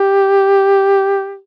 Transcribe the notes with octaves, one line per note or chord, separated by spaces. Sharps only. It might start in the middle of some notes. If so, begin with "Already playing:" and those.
Already playing: G4